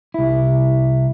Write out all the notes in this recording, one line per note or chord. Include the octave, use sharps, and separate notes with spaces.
C2 E4